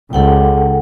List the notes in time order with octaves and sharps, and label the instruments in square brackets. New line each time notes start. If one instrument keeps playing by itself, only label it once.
[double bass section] C#2 [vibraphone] A4 F#5 G5